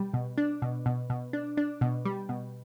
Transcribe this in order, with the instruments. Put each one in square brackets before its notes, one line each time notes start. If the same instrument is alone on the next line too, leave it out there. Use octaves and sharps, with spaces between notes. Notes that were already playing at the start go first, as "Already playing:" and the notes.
Already playing: [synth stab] B2 G3
B2
D4
B2
B2
B2
D4
D4
B2
G3
B2